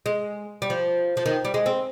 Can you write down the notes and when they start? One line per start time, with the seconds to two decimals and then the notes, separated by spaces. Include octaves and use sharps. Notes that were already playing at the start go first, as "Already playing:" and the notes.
0.06 G#3
0.62 G3
0.70 F3
1.17 F3
1.26 D#3
1.45 G3
1.54 G#3
1.66 C4